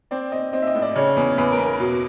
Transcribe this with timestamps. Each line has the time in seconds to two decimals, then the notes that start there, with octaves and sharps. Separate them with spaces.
0.11 C4 D5
0.32 C4 D#5
0.53 C4 D#5
0.62 E5
0.67 D#5
0.75 A2
0.82 D5
0.95 C#3 C#5
1.17 E2
1.38 E2 B4
1.52 A#4
1.58 E2
1.65 A#4
1.80 B2